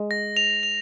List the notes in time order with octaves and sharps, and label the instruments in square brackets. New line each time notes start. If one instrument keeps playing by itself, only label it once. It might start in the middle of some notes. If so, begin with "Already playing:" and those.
Already playing: [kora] G#3
[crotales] A#6
F7
F7